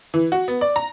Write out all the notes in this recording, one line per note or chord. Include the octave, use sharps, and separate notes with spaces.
E3
F#4
B3
D5
A#5